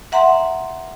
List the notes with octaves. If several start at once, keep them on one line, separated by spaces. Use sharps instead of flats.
E5 F#5 A#5 C6